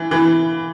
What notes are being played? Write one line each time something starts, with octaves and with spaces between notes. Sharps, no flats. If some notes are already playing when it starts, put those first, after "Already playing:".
Already playing: E3
E3